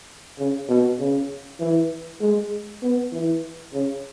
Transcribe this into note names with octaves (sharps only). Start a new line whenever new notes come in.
C#3
B2
C#3
E3
G#3
B3
E3
C#3